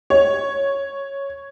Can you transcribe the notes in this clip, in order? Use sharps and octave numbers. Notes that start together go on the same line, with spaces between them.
C#5